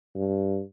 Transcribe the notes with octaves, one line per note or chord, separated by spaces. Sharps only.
G2